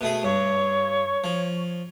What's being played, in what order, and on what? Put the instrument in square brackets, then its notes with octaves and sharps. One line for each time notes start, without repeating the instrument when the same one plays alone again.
[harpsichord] B2 A3 G#4
[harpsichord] G2 [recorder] C#5
[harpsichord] F3